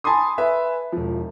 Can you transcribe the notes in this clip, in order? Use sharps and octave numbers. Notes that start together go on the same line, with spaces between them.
G#5 A5 B5 C6 D#6
B4 E5 G#5
E1 F3